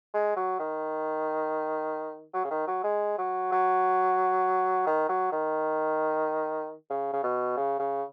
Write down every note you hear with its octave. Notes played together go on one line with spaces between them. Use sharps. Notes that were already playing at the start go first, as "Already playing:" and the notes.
G#3
F#3
D#3
F#3
C#3
D#3
F#3
G#3
F#3
F#3
D#3
F#3
D#3
C#3
C#3
B2
C#3
C#3